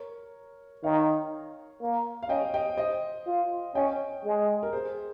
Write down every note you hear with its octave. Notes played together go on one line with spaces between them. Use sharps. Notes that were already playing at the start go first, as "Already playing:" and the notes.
Already playing: A#4 C#5
D#3 C#5 F5
A#3
F5
C#4 D#5 G5
D#5 G5
C5 D#5
F4
C#4 D#5 G5
G#3
A#4
G#4 C5